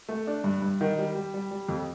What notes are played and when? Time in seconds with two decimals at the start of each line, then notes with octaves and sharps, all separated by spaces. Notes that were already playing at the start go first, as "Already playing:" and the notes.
0.09 A3
0.27 D4
0.44 G2
0.62 G2
0.81 D#3
0.98 G3
1.15 G3
1.34 G3
1.51 G3
1.69 F2